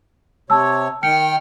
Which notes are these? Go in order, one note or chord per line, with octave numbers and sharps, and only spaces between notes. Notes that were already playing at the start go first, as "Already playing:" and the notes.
C3 C#5 A5 E6
D#3 G5 F6 C#7